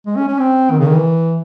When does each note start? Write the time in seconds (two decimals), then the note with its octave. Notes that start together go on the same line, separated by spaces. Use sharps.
0.07 G#3
0.16 C#4
0.28 C#4
0.39 C4
0.71 D#3
0.79 C#3
0.87 D#3
0.96 E3